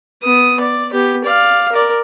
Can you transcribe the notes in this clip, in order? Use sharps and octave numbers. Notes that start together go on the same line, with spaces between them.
B3 D#6
D5
B3 G4
D5 F5
A#4 D5